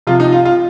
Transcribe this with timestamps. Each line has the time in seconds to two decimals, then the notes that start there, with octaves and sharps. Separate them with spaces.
0.07 C3 F3 F4
0.20 D#4
0.32 F4
0.45 F4